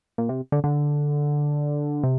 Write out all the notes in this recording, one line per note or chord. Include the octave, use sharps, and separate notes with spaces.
A#2
C3
D3
D3
C3